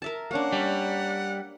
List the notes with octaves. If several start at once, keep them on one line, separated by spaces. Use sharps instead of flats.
A#4 E5 A5
A#3 C#4 D4 F#5
G3